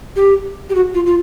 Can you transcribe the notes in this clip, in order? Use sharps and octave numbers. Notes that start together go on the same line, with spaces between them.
G4
G4
F#4
F4
F4